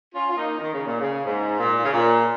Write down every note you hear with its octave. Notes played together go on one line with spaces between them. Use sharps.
C#4 F4
F4
A#3 D#4
D#3
C#3
A#2
C#3
G#2
A#2
C#3
A#2